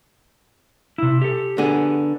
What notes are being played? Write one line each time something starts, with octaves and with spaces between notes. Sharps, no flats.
C3 E4
G4 A4
D3 B3 G#4